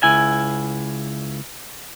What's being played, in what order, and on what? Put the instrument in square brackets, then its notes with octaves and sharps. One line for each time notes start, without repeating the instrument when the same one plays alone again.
[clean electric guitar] C#2 E4 G#5